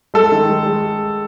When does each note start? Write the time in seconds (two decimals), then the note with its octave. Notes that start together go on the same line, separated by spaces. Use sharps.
0.14 G#3 A4
0.32 D#3
0.49 G#3
0.67 G#3